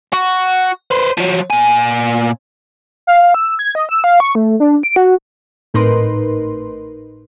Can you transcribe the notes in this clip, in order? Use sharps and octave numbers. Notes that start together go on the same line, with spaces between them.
F#4
B4 C5
F3 F#3
A#2 G#5
F5
F5
E6
G#6
D#5
E6
F5
C#6
A3
D4
D7
F#4
G#1 A2 D#4 A#4 B4 C6